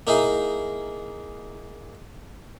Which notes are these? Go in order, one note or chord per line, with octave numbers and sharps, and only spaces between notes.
A#3 D#4 E4 G#4